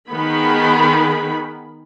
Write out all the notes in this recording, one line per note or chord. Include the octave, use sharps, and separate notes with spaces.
D#3 B3 G#4 B5